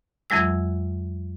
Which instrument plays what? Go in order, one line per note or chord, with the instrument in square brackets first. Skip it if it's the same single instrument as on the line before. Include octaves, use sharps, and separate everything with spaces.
[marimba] F2 E3 F#3 G#3 E6